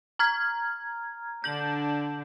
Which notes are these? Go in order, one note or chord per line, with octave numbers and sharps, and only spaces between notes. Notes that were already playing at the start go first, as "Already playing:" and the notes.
A#5 F6 G#6
D3 D4 G6 F#7